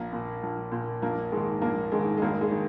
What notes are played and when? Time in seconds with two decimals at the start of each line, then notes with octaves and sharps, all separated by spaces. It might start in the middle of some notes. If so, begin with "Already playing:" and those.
Already playing: A#1 A#3
0.13 A#2
0.43 A#1
0.72 A#2
1.02 A#1 A#3
1.32 G#2 D#3 G#3
1.61 A#1 A#3
1.92 G#2 D#3 G#3
2.17 G#3
2.22 G#1 A#3
2.41 G#3
2.51 D#3